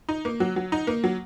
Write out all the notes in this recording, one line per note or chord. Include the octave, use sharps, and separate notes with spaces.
D#4
A#3
F#3
F#3
D#4
A#3
F#3